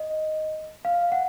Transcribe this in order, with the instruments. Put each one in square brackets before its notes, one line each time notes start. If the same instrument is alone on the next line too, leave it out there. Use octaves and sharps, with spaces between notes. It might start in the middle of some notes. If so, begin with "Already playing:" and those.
Already playing: [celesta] D#5
F5
F#5